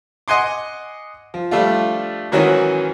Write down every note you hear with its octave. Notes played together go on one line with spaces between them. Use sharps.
D#5 F#5 G#5 C6 D6
F3
F3 G3 A3 D4 F4
G#2 D#3 E3 F#3 C#4 F#4